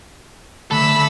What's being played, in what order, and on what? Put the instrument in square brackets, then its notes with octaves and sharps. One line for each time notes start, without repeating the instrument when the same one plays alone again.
[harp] D3 A3 [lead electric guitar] A4 [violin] B5 E6